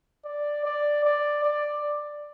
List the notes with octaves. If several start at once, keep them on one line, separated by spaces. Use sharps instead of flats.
D5
D5
D5
D5